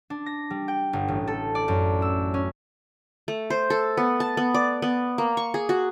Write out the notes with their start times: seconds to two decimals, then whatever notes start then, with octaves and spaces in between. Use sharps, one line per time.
0.10 D4
0.26 A#6
0.50 G3
0.68 G5
0.93 G1
1.08 A1
1.27 A4
1.55 D5
1.68 F#2
2.02 E6
2.34 C#4
3.28 A3
3.50 C5
3.70 A4
3.97 B3
4.20 A5
4.37 B3
4.54 D5
4.82 B3
5.18 A#3
5.37 C#6
5.54 G#4
5.69 F#4